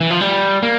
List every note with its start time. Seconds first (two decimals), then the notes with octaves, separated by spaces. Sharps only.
0.01 E3
0.10 F3
0.21 G3
0.63 A#3